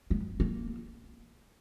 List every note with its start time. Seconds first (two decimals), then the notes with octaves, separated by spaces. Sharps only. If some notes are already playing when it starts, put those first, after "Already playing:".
0.10 B3
0.40 A#3